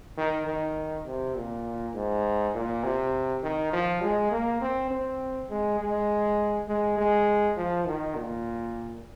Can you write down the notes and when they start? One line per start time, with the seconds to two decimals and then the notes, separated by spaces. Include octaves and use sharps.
0.18 D#3
0.47 D#3
1.06 C3
1.36 A#2
1.95 G#2
2.54 A#2
2.84 C3
3.43 D#3
3.73 F3
4.02 G#3
4.31 A#3
4.61 C4
4.91 C4
5.50 G#3
5.80 G#3
6.68 G#3
6.98 G#3
7.57 F3
7.87 D#3
8.16 A#2